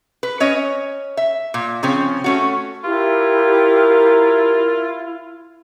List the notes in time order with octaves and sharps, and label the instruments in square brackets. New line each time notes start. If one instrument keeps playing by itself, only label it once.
[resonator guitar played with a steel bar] B4
C#4 C#5 D#5
E5
A#2
C#3 F3 C4 C#4
A3 C#4 F#4
[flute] E4 [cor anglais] F4 [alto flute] G4 [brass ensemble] A#4